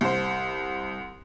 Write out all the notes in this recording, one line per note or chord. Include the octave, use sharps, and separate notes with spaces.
C2 C5